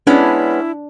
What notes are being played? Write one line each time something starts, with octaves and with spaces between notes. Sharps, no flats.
G#3 B3 C#4 D4 E4